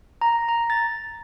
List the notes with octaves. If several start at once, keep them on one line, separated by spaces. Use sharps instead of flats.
A#5
A#5
A6